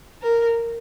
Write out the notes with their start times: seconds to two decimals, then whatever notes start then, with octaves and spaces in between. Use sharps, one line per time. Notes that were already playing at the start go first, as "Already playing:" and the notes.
0.22 A#4